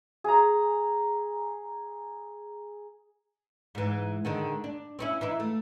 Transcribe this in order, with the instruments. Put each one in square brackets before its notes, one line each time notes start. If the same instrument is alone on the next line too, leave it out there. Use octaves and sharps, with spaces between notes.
[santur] G#4 A#5
[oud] G#2 E3
D3 D#3 G#3
D4
C4 C#4 E4
E3 D#4 E4
A3